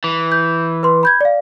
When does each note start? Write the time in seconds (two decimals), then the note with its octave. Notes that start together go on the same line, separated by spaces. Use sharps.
0.04 E3
0.32 G6
0.83 B4 C6
1.03 B5 G6 G#6
1.21 D5 F5